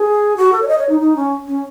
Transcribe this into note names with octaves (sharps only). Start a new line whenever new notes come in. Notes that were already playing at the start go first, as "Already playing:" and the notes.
Already playing: G#4
F#4
A4
C#5
D#5
C#5
D#4
D#4
C#4
C#4